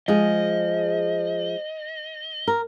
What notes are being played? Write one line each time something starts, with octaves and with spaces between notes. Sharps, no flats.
F3 G#3 G#4 D#5
A#4